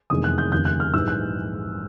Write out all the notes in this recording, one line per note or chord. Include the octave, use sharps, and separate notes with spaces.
F1 E2 C3 D#3 G#3 D#6
F#6
G6
F1 D#2 C#3 G6
F#6
F6
A#1 G#2 E3 G3 E6
F#6